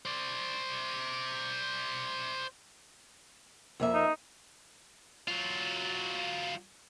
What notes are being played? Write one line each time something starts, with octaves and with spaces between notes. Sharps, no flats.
C5 D5
F2 A#3 E5
D#4
F#3 F4